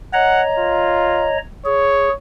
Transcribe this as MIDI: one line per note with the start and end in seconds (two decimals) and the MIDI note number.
0.14 1.38 73
0.14 1.38 75
0.14 0.42 78
0.14 1.38 82
0.59 1.30 65
1.66 2.09 68
1.66 2.14 73